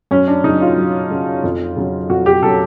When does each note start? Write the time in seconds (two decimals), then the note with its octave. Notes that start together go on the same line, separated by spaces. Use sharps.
0.11 F#2 C#4
0.28 D4
0.44 C#3 F#3 D#4
0.61 F4
0.77 F#2
1.10 C#3 F#3
1.44 F2
1.77 C#3 F#3
2.10 F2 F#4
2.26 G4
2.43 C#3 F#3 A4